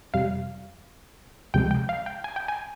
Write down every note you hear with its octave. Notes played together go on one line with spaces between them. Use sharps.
F2 C3 G3 F5
D2 C3 F3 G#3 G5
G5
F5
G5
G#5
G5
G#5